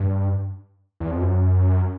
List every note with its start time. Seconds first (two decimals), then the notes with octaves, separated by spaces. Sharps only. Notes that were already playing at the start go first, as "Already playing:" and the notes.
Already playing: G2
1.00 E2
1.11 F2
1.22 F#2